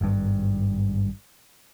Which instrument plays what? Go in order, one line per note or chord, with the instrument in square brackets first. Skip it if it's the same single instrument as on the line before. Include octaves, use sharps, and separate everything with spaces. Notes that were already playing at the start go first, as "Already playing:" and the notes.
[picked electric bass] G#1 G2